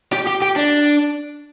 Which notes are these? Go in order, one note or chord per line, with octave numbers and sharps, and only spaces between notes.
G4
G4
G4
D4